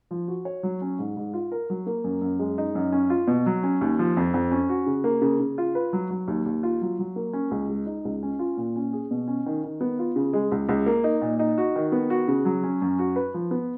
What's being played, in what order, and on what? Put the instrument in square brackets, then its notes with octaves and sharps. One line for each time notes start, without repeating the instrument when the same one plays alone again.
[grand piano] F3
F#4
C#5
F#3
C#4
G#2
G#2
F4
A#4
F#3
A#3
F#2
F#2
G#3
D#4
F#2
C#4
F4
B2
F#3
C#4
D#2
F3
F2
F2
C#4
F#4
C#3
A#3
C#3
C#3
F4
B4
F#3
F#3
D#2
D#2
F4
F#3
F#3
A#3
C#4
C#2
G#3
D#4
C#2
C#4
F4
A#2
C#4
G#4
B2
C#4
D#3
D#3
B3
F4
C#3
G#3
C#2
C#2
A#3
D#4
A#2
D#4
F#4
D#3
B3
F#4
C#3
F#3
C#4
F#2
F#4
B4
F3
B3